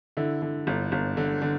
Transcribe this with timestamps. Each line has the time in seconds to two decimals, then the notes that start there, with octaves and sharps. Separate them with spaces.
0.17 D3 E4
0.42 D3
0.67 G1
0.92 G1
1.17 D3
1.42 D3